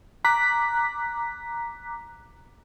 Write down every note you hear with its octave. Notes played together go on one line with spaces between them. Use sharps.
A#5 D6 F#6 B6